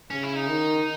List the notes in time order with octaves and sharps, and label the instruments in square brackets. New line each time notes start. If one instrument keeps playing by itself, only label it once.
[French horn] C#3 [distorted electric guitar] C#4
[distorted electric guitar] E4
D#4
[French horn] D#3